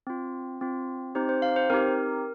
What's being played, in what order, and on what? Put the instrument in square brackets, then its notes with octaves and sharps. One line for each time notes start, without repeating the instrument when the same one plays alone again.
[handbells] C4 F4
C4 F4
C4 D#4 G4 C5
C5
F5
C5
C4 D#4 G4 A#4